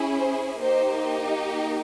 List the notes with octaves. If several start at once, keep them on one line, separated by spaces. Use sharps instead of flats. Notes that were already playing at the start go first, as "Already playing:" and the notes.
Already playing: C#4 E4 G#4
C5
A#3 D#4 G4 C5